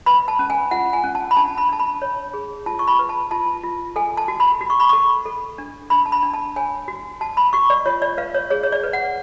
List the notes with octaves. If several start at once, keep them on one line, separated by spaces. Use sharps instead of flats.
B4 B5
A5
C#4
G#5
F4 F#5
G#5
C#4
A5
B5
D4 A5
B5
D4 A5
B5
C#5
G#4
F4 A5
C#6
B5
B4
A5
F4 A5
F4
A4 G#5
A5
F#4
B5
F#4
C#6
B5
A4 C#6
A4
D4
D4 B5
A5
B5
D4
A5
C#5 G#5
F#4
F#4 A5
B5
F#4 C#6
D5
F4 C#5
D5
B4 F5
C#5
G#4 C#5
C#5
D5
B4
F#5